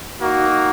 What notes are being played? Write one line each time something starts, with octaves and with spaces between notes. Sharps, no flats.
A#3 D#4 F#4